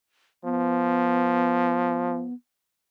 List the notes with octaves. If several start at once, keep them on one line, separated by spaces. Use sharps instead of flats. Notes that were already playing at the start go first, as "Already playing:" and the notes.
F3 B3